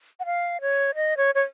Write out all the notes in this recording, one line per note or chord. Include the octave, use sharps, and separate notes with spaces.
F#5
F5
C#5
D#5
C#5
C#5